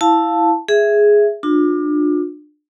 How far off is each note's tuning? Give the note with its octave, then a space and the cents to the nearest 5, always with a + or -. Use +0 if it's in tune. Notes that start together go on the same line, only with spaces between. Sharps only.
E4 +0 F5 +0 A5 +0
G#4 +0 E5 +5
D4 +25 F4 +40